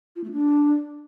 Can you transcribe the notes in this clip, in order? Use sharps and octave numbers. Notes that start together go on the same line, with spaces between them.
F4
A3
D4